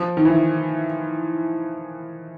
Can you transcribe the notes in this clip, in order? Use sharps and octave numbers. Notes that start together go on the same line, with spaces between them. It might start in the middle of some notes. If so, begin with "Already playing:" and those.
Already playing: F3
D#3
E3